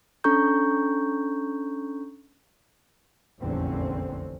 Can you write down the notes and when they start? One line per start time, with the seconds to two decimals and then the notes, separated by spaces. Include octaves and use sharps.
0.24 C#4 D4 A4 A#5 C#6 G6
3.40 F1 A#1 E2 D3 C4 C#4